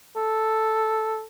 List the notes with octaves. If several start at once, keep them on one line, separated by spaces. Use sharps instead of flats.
A4